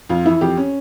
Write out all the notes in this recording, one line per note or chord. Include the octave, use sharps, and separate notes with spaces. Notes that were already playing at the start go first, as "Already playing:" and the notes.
F2 F4
E3 E4
F2 G4
C#4